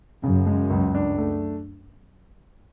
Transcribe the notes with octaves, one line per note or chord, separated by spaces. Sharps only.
F#2 C#3
G#3
C#2
D4
A3